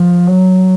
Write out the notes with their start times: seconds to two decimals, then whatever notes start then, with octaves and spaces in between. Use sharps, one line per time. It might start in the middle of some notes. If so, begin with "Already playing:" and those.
Already playing: F3
0.27 F#3